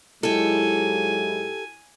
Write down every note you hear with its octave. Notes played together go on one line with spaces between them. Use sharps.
G#2 F#3 G#3 E4 G4 A4 G#5